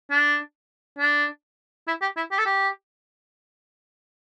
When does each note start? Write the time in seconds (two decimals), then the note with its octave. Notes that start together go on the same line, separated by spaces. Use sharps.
0.11 D4
0.99 D4
1.88 E4
2.02 G4
2.17 E4
2.31 G4
2.38 A4
2.46 G4